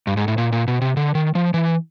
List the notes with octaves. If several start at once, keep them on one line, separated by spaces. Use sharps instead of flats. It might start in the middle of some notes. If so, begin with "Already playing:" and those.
G2
G#2
A2
A#2
A#2
B2
C3
D3
D#3
F3
E3